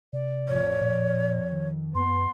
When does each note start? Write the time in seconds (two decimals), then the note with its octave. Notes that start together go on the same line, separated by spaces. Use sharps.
0.13 C3 D5
0.48 A1 F2 F3 C#5
0.81 F2 A#2
1.52 D#3
1.95 F#2 B3 C6